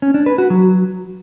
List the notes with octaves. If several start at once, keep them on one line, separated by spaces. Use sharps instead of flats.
C#4
D4
B4
F#4
F#3